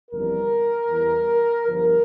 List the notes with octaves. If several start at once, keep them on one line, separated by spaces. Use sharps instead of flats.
G1 F2 E3 G3 A#4
E2 E3 G3
G1 G2 D3 F3 A#4